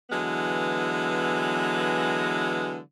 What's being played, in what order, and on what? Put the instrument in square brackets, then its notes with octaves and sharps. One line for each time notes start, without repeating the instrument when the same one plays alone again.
[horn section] D3 E3 F#3 G#3 B3